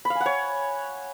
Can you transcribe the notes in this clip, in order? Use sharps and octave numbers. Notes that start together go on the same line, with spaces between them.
B5
F5
G#5
F#5
C#5